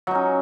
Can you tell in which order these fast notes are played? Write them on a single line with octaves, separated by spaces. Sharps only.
F#3 D#4 C#4